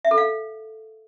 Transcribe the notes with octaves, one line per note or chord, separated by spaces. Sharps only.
E5
A4
F5